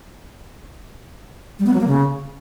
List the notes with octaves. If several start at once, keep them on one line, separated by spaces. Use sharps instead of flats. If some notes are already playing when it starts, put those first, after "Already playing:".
G3
B3
F#3
A#3
C#3